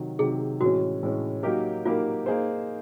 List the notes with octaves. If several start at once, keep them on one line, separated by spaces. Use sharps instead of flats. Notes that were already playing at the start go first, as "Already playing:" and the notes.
Already playing: C3 D#3 F#3
C3 D#3 F#3 G#4
A2 E3 G#3 C#4 F#4
A2 E3 G#3 C#4
F#3 A#3 D#4 G4 A#4
F#3 A#3 D#4 F4 G4 A#4
A#3 D#4 G#4 C5